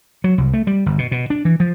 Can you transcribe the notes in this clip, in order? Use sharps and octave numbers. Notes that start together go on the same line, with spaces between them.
F#3
C2
A3
G3
G1
B2
B2
D4
E3
F3